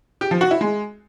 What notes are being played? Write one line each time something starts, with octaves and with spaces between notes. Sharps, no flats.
G4
F3
F#4
E4
G#3